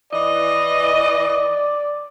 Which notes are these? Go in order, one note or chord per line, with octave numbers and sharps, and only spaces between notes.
E3 D5 D#5